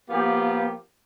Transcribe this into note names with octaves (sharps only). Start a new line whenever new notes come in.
F3 A#3 B3 F4 G4